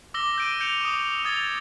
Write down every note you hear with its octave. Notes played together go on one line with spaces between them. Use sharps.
D6 E6 A#6 G7
G6 D7 D#7
G6 C#7 D7 F7
C#6 D#6
D#6 G#6 A6 F7 G7